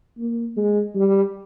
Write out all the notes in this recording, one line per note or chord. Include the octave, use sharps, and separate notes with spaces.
A#3
G#3
G3